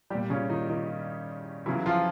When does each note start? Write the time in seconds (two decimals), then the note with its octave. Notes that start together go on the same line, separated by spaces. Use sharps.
0.10 A#2 G3 G4
0.30 C#3 C#4
0.50 D#3 D#4
0.69 D#3 D#4
1.66 C#3 E3 F#3 E4
1.86 F3 F4